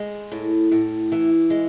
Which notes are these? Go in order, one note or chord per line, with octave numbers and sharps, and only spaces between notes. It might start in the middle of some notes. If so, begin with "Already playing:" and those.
Already playing: G#3
A2
A2
E3
G#3